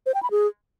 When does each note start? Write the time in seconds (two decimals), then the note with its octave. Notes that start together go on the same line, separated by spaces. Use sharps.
0.06 C5
0.14 G5
0.23 B5
0.31 G#4